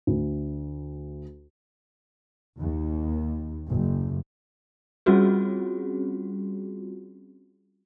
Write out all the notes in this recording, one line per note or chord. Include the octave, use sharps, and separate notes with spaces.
D2
D#2
F#1
G3 C4 C#4 F4 F#4 G#4